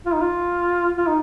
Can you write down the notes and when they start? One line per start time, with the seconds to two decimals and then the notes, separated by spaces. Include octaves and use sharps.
0.06 F4
0.13 D#4
0.21 F4
0.97 F4
1.07 D#4